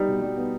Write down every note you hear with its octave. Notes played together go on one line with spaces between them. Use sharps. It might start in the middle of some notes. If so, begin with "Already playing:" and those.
Already playing: G3 B3 D#4
B2
G3
B3